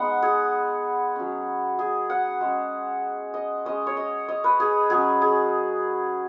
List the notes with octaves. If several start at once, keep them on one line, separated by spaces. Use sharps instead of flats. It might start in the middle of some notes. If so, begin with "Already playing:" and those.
Already playing: G#3 B3 D#4 F#5
G#4
F#3 C#4
G#4
F#5
G#3 C#4
D#5
G#3 C#4 D#5
C#5
D#5
D#5
B4
G#4
F#3 C#4 G#4
G#4